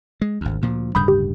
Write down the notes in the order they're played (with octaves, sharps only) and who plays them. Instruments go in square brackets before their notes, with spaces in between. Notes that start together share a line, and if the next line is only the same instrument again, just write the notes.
[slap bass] G#3
G#1 D2
D2 A#2 F3
[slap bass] D1 G2 C#3 [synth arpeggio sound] B5 D#6 G6
[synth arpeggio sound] G4